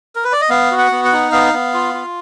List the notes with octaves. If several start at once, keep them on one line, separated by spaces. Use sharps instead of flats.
A#4
B4
D5
D#5
B3 F5
F#4
F#5
B3
F#5
D#4
B3 F5
B3
F4
F4